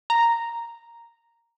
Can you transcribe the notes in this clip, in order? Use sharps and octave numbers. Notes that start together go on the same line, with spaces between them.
A#5